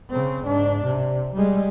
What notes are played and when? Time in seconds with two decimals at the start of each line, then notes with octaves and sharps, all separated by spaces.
0.10 C#3 C4
0.46 G#2 D4
0.84 C3
1.34 G3 G#3